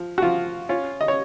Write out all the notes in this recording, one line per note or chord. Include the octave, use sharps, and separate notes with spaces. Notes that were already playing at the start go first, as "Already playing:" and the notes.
Already playing: F3
F#4
F3 F4
C#4 F4
D#5
C#5